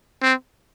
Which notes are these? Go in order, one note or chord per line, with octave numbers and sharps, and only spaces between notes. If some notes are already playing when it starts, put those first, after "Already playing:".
C4